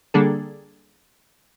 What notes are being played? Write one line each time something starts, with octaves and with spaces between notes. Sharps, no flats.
D3 G3 A#3 D4 G#4 A4